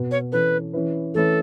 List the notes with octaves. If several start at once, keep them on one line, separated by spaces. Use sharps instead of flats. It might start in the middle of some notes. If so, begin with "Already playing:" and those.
Already playing: B2 B3 F#4 B4
C#5
E3 C#4 A4 B4
E3 C#4 E4 B4
E3 A3 C#4 E4 A4 B4